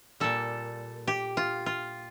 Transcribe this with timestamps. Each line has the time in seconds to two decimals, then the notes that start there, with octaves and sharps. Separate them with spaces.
0.20 A#2 G3 A4
1.07 G4
1.37 F4
1.66 F4